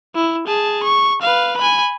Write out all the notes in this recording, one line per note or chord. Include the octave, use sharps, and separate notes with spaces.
E4
G#4 A5
C#6
B4 F5
G#5 B5